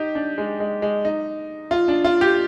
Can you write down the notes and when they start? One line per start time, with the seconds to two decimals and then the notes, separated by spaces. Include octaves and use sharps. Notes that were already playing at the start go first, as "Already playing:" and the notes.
Already playing: D#4 G4
0.15 D4
0.38 G#3
0.60 G#3
0.82 G#3
1.05 D#4
1.71 F4
1.88 D4
2.04 F4
2.21 G4